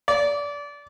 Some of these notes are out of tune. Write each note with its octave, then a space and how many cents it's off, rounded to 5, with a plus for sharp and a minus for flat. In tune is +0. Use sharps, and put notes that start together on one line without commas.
D5 -25